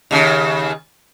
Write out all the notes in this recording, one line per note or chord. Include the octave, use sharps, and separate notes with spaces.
D#2 C#3